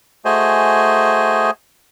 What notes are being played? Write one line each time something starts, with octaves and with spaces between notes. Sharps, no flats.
A3 F#4 G#4 C5 D#5 G#5